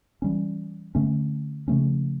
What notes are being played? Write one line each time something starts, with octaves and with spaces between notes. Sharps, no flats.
E3 G3 C#4
D3 A3 C#4
C#3 F3 A3 C#4